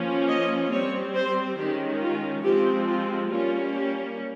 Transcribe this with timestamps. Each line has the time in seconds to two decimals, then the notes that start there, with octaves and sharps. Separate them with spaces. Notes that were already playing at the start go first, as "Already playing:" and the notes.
Already playing: F3 A#3 C#4
0.28 D#5
0.71 G3 C4 C#5
1.14 C5
1.58 D#3 G#3 C#4 G4
2.01 F4
2.43 F3 G#3 C4 G4
2.88 F4
3.30 G3 A#3 C#4 F4
3.74 G4